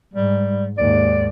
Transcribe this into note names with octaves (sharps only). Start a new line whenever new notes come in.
G#2 G3
D#2 G#2 D5